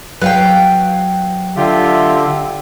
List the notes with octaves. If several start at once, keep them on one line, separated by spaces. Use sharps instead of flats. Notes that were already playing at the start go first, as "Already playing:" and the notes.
F#3 B4 F5 G5
D3 F4 G4 E5